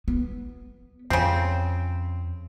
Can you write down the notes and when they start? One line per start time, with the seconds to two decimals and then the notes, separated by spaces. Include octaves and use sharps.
0.08 B3
1.10 F2 C#3 C4